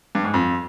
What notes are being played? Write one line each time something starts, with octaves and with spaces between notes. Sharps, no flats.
G2
G#2
F2